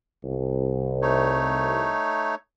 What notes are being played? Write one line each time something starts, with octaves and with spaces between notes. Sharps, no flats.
C2
A3 D#4 C#5